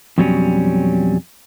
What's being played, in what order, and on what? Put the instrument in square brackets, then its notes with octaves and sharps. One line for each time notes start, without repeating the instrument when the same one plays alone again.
[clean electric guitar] F2 B2 F#3 G3 C4 C#4